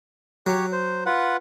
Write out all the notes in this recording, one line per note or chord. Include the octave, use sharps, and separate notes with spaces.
F#3 G4 C#5
C5
F4 B4 F#5